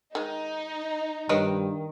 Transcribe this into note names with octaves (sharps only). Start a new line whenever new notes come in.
D#3 G#3 D#4
G2 D#3 B4 C#5 D#5